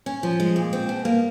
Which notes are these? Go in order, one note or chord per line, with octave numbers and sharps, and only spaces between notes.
C#4
F3
G#3
A#2
C4
B2
A#3